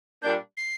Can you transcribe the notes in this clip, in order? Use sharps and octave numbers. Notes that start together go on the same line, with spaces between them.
A#2 G3 A#3 D4 G6
C7